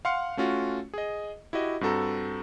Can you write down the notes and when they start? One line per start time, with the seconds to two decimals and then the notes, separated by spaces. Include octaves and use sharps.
0.05 F5 F#5 C6 F6 C#7
0.37 A3 C#4 F4 F#4
0.94 G#4 D#5
1.53 E4 F#4 G4 D#5
1.81 G2 C4 F#4 A4 A#5